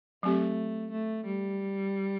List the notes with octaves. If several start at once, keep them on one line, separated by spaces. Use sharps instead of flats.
F#3 A3 C4 G4
A3
G3